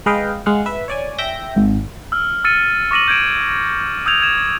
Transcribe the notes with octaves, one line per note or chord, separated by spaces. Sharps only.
G#3 B4 D#5 F5 G5
G#3 F5 F#5
B4 E5
C#5 D5 G#5
E5 G5 G6 A#6
G#1
E6 F6
E6 F6 A6 C#7 D#7
C#6 D6 A#6 D#7 F#7
G6 G#6 D7 E7
D#6 E6 G6 G#6 F7
G#6 E7